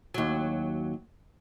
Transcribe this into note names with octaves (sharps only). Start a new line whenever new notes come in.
D#2 F#3